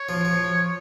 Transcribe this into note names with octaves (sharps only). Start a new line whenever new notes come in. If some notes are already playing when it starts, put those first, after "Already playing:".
Already playing: C#5
F3
F3